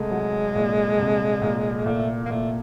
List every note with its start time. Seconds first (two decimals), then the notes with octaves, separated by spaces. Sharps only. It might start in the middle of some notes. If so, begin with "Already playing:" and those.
Already playing: C2 G#3 A3
0.11 F#3
0.55 A#2
0.99 C2
1.42 A#2
1.86 A#2 A3
2.25 A#3
2.29 A#2 A3